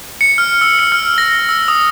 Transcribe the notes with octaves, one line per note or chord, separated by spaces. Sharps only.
C#7
F6
E6
C#7
F6
A#6
E6
D#6